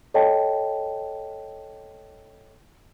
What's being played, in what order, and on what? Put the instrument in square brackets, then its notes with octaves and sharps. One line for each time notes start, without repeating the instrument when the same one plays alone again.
[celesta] A4 C#5 D#5 G5 A5